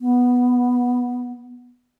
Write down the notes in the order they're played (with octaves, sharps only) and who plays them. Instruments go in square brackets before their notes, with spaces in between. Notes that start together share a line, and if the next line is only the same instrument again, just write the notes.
[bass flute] B3